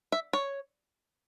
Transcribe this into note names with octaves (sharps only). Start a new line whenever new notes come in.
E5
C#5